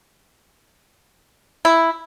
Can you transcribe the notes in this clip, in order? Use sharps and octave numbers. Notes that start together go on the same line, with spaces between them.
E4